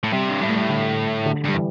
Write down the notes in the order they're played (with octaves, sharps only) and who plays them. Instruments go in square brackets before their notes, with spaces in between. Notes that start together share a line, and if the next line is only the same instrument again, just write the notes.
[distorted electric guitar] A2
[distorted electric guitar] C3 [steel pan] G3
[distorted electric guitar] G2
[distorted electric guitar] A2 [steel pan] G3
[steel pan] A3
G3
D3
D3
[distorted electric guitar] G2 [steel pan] G3
[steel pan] E3